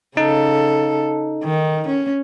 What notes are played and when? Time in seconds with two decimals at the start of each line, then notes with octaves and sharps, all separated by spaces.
0.17 C#3 D#4 A4
1.44 D#3
1.88 C#4